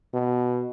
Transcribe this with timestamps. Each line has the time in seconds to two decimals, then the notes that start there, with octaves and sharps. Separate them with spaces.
0.14 B2